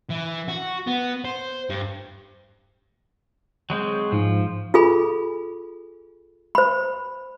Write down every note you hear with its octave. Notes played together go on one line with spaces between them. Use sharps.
E3
F#4
B3
C5
G2
F#3 G#3 C4
G#2 F3
F4 G#4 A4 G#5 B5
C5 B5